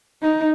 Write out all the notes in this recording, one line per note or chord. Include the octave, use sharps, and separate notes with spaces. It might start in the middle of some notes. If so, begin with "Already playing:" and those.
D#4